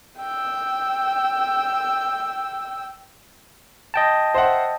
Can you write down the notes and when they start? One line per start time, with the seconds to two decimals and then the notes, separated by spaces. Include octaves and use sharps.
0.19 G5 E6
3.94 D#5 G5 A5
4.34 C5 E5 F#5